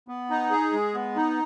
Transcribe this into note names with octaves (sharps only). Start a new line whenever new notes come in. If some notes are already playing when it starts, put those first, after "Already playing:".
B3
D#4
G#4
G#3
B3
D#4